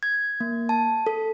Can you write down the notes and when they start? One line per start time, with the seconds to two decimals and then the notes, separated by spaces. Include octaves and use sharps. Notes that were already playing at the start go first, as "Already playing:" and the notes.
0.03 G#6
0.40 A#3
0.69 A5
1.07 A4